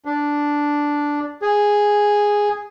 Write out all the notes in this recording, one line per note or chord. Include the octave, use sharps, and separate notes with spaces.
D4
G#4